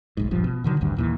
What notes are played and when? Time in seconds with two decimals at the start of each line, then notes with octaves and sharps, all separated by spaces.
0.17 F1 B1 G#2
0.31 E1 A#1 G2 F3
0.44 B2
0.64 B2 D3 D#3 F#3
0.81 G#1 D2 G2
0.97 D#2 A#2 E3